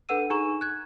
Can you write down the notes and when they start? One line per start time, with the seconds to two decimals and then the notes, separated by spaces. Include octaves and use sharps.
0.09 D4 A4 B4 F#5 E6 D#7
0.30 D#4 G#4 A#5 C#6 E7
0.61 F#6 G#6